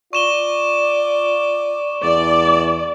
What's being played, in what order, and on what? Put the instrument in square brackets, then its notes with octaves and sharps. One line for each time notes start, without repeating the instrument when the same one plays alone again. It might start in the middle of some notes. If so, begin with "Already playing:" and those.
[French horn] F4 [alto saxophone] D5 [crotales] C#6 E7 G7
[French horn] E2 [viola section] D5